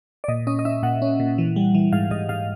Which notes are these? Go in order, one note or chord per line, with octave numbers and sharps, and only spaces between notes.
D5
A#2 D#5
C#4 D#5
D#5
C#4 E5
A#2 F#5
C#4
A#2
E3
G3
E3
G#2 F5
G#2 D#5
G#2 F5